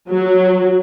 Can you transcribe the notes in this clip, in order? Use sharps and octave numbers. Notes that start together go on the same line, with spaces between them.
F#3